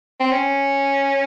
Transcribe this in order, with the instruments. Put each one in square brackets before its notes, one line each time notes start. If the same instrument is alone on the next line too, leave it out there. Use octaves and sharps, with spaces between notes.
[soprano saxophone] C4
C#4